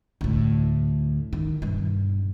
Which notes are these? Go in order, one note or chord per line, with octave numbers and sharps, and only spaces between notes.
D2 A2
D#3
G2 B2